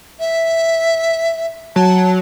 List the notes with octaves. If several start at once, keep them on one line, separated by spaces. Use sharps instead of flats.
E5
F#3 A5